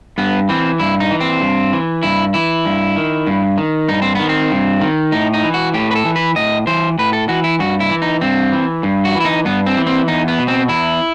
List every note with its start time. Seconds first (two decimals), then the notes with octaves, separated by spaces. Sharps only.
0.18 G2 B3
0.49 E3 C4
0.80 G2 E4
1.00 D#4
1.11 E3
1.20 C4
1.41 G2
1.73 E3
2.03 G2 E4
2.34 E3 E4
2.65 G2
2.96 D#3
3.26 G2
3.58 D#3
3.88 G2 D#4
4.02 C4
4.15 D#3 B3
4.29 C4
4.51 G2
4.81 D#3
5.12 A2 D#4
5.34 D#4
5.44 E3
5.54 F#4
5.74 A2 G4
5.91 B4
5.95 A4
6.05 E3
6.16 B4
6.36 A2 D#5
6.67 E3 C5
6.98 A2 B4
7.13 A4
7.29 E3 F#4
7.44 E4
7.59 G2 F#4
7.80 E4
7.90 E3
8.02 D#4
8.21 G2 C4
8.52 E3
8.83 G2
9.05 F#4
9.15 E3
9.20 E4
9.25 D#4
9.45 G2 B3
9.66 C4
9.77 E3
9.87 C4
10.08 E2 D#4
10.28 B3
10.39 B2
10.48 C4
10.69 E2 E4